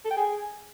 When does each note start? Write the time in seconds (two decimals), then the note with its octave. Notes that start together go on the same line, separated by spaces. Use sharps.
0.05 A4
0.11 G5
0.17 G#4